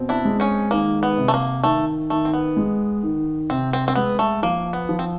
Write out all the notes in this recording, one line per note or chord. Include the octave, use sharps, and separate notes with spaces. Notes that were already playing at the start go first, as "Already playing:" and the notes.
Already playing: B2 C4
D4 E4
G#3
C#4 D#4
D#3 A#3
B3
C3
A3
A#3
D#3 A3
D#3 A3
C4
B3
G#3
D#3
C3 C4
C4
C4
G#3 B3
A3
F3 A#3
B3
F3
C4